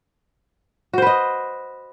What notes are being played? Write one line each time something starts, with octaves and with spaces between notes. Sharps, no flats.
F#4 B4 C5 D#5